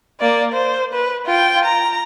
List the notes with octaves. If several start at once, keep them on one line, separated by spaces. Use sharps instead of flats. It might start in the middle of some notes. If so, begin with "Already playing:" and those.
A#3 D5
C5
B4
F4 G5
A#5